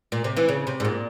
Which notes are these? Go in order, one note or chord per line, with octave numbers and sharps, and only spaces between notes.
A#2
C3
E3
C#3
C3
G#2
A#2